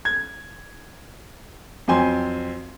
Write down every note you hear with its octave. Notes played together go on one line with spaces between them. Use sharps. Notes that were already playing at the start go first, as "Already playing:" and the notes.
G#6
F2 F#3 C4 G#5 C6